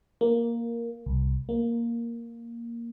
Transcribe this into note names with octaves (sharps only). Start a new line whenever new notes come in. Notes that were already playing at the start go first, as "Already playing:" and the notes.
A#3
C2
A#3